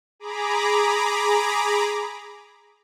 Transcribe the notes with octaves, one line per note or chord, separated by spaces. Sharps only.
G#4 A#5 B5 D6